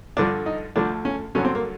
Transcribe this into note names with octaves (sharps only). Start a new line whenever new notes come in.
G2 D3 F3 D4
D#4
D2 D3 F3 D4
C#4
G2 D3 F#3 C#4
C4
A#3